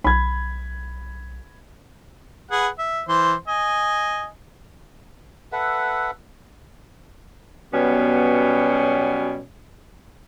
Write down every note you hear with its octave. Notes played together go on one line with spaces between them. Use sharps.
B1 B5 G#6
G#4 B4 F#5
E5
E3 C5 C6
D#5 G#5
A4 B4 E5 F#5
B2 F#3 G3 B3 C#4